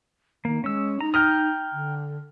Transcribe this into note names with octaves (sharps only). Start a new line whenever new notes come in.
D#3 A#3
G#3 C#4 E6
D#4 A#5
G5 A#5 D#6 F6
D3